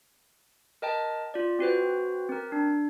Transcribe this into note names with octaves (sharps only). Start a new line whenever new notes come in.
A#4 D#5 G5 A5
F4 D5
C4 F#4 B4 C5
C4 A#4
D4